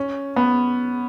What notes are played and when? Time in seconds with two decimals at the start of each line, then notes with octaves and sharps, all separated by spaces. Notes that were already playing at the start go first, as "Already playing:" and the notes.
Already playing: C#4
0.36 B3